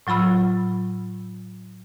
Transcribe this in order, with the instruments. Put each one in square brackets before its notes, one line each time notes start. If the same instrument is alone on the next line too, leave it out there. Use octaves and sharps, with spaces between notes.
[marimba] A2 F#3 F4 B5 E6